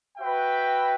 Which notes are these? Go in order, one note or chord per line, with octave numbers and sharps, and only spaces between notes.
F#4 B4 E5 G5